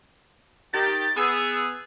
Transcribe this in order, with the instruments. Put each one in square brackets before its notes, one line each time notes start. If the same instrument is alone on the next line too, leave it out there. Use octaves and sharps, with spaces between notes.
[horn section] D#3 G4 [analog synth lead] A6
[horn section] B3 G#4 [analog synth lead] E6